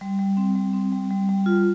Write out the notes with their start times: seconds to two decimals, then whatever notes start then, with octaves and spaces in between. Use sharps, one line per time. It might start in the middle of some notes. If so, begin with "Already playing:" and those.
0.01 G3
0.19 G3
0.37 C4
0.55 G3
0.73 C4
0.92 G3
1.10 G3
1.29 G3
1.46 F4